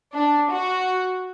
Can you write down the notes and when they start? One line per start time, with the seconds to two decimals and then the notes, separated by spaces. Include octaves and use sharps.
0.14 D4
0.50 F#4